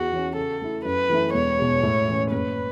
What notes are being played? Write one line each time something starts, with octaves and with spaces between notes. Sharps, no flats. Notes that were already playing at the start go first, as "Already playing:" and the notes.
Already playing: E2 F#4
E3 C#4
C#3 A4
A3 E4
F#2 B4
E3 A3 E4
E1 C#5
E2 B2
A2
E3 C#4
F#1 B4